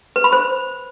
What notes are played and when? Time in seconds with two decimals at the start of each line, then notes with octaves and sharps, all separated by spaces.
0.16 B4
0.24 B5
0.32 C5